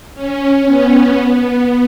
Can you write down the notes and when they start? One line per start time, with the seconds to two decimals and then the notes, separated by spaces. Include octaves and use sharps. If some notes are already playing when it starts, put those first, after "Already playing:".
0.14 C#4
0.66 B3
1.17 B3